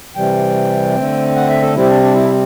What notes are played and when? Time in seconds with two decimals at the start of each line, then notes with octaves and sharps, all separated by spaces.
0.16 C3 E3 G3 G5
0.96 D3 A3 C4
1.36 F#5
1.49 E5
1.62 A4
1.75 C3 G3 C4 E4
1.89 D4
2.02 D4
2.14 E4